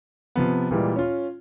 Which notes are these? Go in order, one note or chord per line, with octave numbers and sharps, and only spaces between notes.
C3 F3 B3
A#2 E3 G3 G#3
C#4 F4